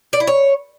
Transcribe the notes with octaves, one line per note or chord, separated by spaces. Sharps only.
D5
E4
C#5